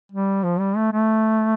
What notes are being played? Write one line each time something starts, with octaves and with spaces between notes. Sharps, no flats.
G3
F3
G3
A3
A3